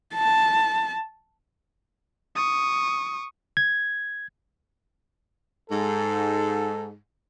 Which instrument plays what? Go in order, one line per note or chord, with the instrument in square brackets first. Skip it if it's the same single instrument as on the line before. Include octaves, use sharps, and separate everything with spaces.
[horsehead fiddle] A5
[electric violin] C#6 D#6
[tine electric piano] G#6
[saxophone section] G#2 [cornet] A4